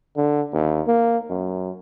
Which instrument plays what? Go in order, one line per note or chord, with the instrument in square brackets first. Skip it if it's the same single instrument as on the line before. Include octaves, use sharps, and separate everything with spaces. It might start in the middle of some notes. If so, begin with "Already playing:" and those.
[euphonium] D3
D#2
A#3
F#2